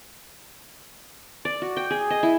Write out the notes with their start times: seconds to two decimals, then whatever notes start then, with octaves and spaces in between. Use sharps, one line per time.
1.45 D5
1.62 F#4
1.77 G5
1.90 G#4
2.10 D#5
2.23 E4